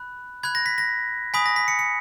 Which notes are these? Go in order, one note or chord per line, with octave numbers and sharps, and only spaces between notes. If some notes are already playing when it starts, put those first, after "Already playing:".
Already playing: B5 F#6
B5 F#6 G#6
A#6
B6
A#6
G#5 B5 D#6 B6
A#6
B6
C#7
C#7